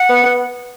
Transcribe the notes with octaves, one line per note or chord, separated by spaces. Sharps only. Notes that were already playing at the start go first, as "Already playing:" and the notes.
Already playing: F#5
B3
B3